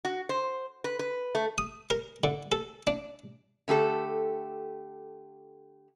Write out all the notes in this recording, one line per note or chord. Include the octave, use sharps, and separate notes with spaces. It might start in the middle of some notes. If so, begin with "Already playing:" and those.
F#4
C5
B4
B4
A3
D#6
A#4
D3
A4
D4
D3 A3 G4 A4